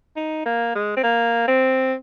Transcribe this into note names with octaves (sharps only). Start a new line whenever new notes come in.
D#4
A#3
G#3
C4
A#3
C4